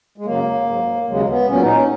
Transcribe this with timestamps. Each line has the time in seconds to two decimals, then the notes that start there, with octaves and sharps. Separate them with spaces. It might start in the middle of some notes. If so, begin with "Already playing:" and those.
0.18 G#3
0.25 F#2 C#3 F#3 A#3
0.67 G#2 F#3
1.07 D#2 C#3 F#3 G#3
1.28 B3
1.48 A#2 F#3 C#4
1.62 D#4
1.75 C#4